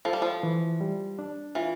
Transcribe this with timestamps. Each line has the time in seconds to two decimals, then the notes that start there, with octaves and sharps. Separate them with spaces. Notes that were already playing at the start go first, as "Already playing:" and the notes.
0.05 F3 A4
0.13 G3
0.22 F3
0.43 E3
0.81 G3
1.19 D4
1.55 E3 F4